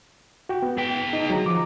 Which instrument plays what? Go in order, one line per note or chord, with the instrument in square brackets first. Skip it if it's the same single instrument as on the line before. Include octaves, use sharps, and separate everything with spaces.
[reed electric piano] F#4 G5
B3
[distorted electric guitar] G#4 G5
[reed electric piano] D#4
[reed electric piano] D3 F#3 [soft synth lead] A#5
[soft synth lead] F3 [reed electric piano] D6